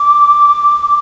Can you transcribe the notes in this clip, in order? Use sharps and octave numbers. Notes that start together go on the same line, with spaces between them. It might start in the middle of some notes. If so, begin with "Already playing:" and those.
Already playing: D6